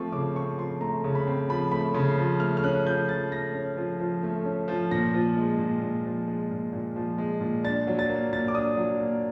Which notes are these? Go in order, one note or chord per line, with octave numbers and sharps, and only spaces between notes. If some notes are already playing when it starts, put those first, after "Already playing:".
Already playing: F3 A3 C4 C#6
C#3 D6
C4 C#6
F3 C6
A3 A#5
C#3
B5
C4
F3 B5
A3 B5
C#3 C6
F3
A3 F6
F6
C#4 F#6
F3 G6
F3 A6
A3 A#6
C#4
F3
F3
A3
C#4
F3
A#2 A#6
F3
G#3
A#2
A#2
F3
G#3
A#2
A#2
F3
G#3
A#2
D4 A6
F#3
A6
A#3
A#2 A6
D6
D4 D#6
F#3
A#3